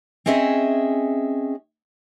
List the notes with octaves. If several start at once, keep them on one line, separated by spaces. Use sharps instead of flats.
C4 C#4 G#4 D#5 E5